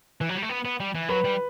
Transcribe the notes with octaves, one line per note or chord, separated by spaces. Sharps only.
E3
F#3
G3
A3
B3
B3
G3
E3
F#3 B4
G3